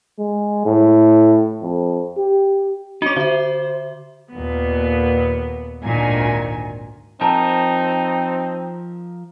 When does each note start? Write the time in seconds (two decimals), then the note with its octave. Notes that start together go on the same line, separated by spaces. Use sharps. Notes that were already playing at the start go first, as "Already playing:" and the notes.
0.19 G#3
0.65 A2
1.62 F2
2.17 G4
3.02 C#4 D#4 F#4 D6
3.16 D3 C5 E5
4.31 D#2 A#2 B3
5.83 G#1 D2 A#2 D#3 G#5
7.21 F3 C4 D#4 A#4 A5 A#5